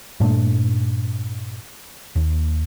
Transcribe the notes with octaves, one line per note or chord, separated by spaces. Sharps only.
G2 A#2 A3 D4
D#2